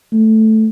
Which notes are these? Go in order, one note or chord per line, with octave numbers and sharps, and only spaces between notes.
A3